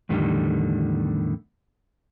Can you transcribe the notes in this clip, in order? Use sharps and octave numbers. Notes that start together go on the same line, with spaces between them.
E2 A2 D3 D#3 G3